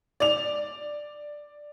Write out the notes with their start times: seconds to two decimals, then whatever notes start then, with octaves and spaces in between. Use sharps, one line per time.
0.20 D5 F7